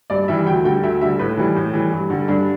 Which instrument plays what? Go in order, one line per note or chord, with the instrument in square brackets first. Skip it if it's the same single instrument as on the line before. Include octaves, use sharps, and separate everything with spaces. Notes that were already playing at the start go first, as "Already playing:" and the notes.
[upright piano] G2 D5
E3 G3 E5
D2 G5
D3 G3 G5
D2 E5
D3 G3 E5
A2 B4
E3 G3 E4
A2
E3 G3
G2
D3 G3
G2 D4